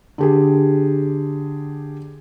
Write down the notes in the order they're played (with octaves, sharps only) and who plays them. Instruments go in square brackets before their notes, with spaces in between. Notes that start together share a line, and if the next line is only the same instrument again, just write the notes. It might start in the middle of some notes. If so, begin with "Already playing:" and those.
[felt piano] D3 G4 G#4